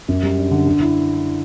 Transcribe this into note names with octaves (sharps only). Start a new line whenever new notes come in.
F#2
G3
D4
D3
D3
E4